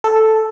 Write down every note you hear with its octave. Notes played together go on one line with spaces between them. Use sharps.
A4